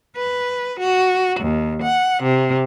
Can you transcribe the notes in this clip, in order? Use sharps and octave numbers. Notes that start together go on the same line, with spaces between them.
B4
F#4
D#2
F#5
C3